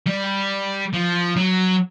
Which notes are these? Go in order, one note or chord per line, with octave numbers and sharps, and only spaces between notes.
G3
F3
F#3